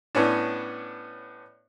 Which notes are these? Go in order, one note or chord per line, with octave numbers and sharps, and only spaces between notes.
A2 B3 C#4 D4